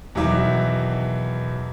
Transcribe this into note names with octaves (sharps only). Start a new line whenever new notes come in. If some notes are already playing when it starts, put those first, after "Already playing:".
E2 B2 D#3 F#3 E5 D6